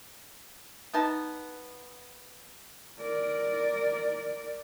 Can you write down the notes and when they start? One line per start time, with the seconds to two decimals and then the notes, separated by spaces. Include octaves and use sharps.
0.94 B3 D#4 A5
3.00 A#4 D5